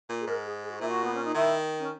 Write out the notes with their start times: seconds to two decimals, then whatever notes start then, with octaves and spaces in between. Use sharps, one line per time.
0.09 A#2
0.20 G#4
0.27 G#2 A#4
0.45 G#4
0.63 G#4
0.71 F#4
0.80 A#2 E4
0.87 F#4
1.04 B3
1.14 C#4
1.24 D#4
1.34 D#3 E4
1.79 C#4